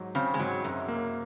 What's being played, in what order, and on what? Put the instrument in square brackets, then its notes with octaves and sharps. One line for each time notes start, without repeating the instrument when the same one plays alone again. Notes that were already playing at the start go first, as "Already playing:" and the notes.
Already playing: [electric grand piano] G#2 F#3
[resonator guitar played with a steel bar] C#3 [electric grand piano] C4
[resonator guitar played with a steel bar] G#3
[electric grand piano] G#2 [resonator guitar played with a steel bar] F#3
[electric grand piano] F#2 [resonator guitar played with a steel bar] C3
[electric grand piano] A#3